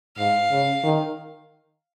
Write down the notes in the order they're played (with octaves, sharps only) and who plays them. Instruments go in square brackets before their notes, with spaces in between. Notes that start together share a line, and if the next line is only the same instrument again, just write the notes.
[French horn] G#2 [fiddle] F5
[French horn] C#3
D#3